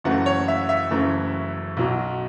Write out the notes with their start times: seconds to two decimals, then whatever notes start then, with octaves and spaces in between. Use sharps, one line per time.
0.04 F#1 F#2 E3 A3 F#5
0.26 C#5
0.48 E5
0.69 E5
0.91 F#1 F#2 E3 A3
1.77 B1 B2 F#3